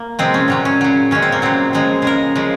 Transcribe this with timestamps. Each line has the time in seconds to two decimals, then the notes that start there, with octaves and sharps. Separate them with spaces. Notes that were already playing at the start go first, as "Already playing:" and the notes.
Already playing: A#3
0.19 C3 F3 G#3 C4
0.34 C#4
0.48 A#2 F#3 C#4
0.65 C#4
0.81 C#3 F#3
1.11 A#2 G#3 C#4
1.22 C4
1.32 A#3
1.42 C#3 F#3 C4
1.73 C#3 F3 G#3
2.02 C#3 G#3 A#4
2.36 C#3 F3 G#3